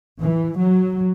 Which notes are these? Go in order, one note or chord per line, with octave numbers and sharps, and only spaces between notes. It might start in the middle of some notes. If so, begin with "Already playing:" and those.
E3
F#3